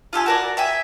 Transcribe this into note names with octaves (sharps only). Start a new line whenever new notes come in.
F4 G4 A4 G#5
F#4 A#4 D5
E5 G5 G#5